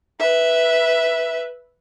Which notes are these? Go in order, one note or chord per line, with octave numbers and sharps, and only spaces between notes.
B4 E5